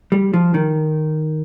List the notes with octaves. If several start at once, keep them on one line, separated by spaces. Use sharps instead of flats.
G3
F3
D#3